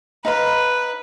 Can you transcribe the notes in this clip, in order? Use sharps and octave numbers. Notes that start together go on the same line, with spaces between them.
D#4 B4 F5 B5